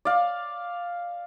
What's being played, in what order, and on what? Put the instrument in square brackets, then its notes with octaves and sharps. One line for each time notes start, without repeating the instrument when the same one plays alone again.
[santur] D5 F5